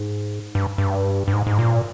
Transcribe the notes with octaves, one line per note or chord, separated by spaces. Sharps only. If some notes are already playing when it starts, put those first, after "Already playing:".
Already playing: G#2
G2
G2
G2
G#2
G#2
A#2